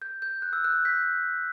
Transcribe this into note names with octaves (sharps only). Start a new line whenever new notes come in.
G6
G6
F#6
E6
F#6
G6 B6